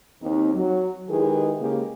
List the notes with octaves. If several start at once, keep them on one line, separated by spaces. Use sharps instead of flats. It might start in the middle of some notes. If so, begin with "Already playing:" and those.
D#2 C4 D#4
F#3
D#3 G#3 E4 G4 G#4 B4
C#3 G#3 A#3 G4 G#4